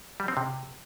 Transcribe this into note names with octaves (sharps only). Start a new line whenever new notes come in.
G3
C4
C3